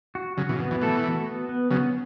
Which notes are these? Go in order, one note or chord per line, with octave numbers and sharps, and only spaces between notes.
F#4
C#3 F#3 F#4
B2 E3
C#3
B2 B3
B2 E3
E3 A3 A4
F#4
B3
B3
C#3 F#3 B3